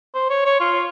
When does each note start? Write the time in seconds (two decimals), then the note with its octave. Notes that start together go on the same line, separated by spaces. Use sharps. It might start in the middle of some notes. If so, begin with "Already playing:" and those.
0.14 C5
0.30 C#5
0.45 C#5
0.61 F4